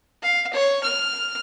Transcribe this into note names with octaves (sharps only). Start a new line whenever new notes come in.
F5
C#5
F6